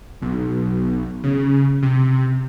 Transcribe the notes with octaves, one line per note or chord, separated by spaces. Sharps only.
B1
C#3
C3